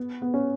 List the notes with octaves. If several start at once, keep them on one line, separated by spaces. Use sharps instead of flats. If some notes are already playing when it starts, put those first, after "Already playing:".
Already playing: B3
B3
C#4